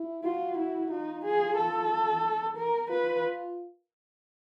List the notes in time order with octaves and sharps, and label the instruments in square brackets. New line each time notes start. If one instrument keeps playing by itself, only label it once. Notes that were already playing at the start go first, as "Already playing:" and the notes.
Already playing: [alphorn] E4
[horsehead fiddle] F4 [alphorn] F#4
[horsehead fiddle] E4
[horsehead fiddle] D#4 [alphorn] F4
[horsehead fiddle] G#4
A4
A#4
[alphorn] F4 [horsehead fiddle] B4